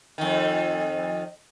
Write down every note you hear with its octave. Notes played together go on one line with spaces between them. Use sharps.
F2 D#3